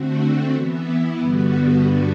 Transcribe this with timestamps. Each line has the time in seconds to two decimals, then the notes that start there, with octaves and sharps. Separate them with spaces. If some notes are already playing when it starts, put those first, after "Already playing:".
Already playing: D3 A3 C4 F#4
0.53 E3 B3 E4
1.20 G2 D3 G3 B3 F#4